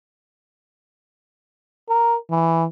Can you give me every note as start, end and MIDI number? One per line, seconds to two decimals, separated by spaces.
1.89 2.17 70
2.30 2.66 52